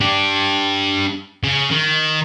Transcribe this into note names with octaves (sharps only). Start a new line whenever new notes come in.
D4 G4
C#3
D#3